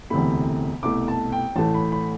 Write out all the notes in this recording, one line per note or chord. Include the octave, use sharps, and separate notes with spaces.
E1 D2 C3 E3 A3 B5
C2 B2 A3 D6
A5
G5
A1 A2 E3 A3 A5
B5
B5